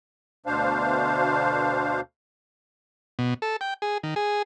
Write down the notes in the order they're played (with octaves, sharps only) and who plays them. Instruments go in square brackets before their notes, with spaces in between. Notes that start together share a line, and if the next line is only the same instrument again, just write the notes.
[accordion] D2 B2 D4 C5 F5
[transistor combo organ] B2
A4
G5
G#4
D#3
G#4